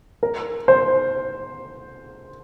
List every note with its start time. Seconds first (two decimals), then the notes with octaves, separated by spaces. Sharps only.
0.23 A#4
0.68 C5